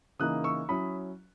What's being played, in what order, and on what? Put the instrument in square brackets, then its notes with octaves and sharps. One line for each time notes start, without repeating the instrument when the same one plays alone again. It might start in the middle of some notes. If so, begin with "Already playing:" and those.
[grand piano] C#3 E3 A#3 D#4 D#6 F#6
C#6 E6
F#3 C#4 E4 B5 D#6